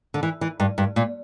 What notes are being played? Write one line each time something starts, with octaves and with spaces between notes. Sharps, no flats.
D3
E3
E3
G2
G2
A#2